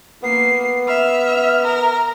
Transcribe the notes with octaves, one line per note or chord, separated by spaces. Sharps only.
A#3 B3 C7
E5 F6
A#4